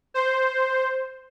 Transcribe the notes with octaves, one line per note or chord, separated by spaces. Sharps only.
C5